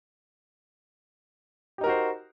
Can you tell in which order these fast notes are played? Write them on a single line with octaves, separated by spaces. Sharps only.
G4 D#4 A#4 F#4 C5